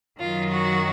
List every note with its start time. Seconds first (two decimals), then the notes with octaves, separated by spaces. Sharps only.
0.19 F#2 D#3 F#3 F4
0.50 F#4